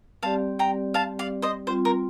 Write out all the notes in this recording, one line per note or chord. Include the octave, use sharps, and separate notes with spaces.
G3 C4 G4 D5 F5 A5
G5 A#5
F5 A5
D5 F5
C5 D#5
G3 C4 F4 C5
A#4